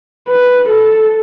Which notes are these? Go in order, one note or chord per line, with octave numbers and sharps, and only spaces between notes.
B4
A4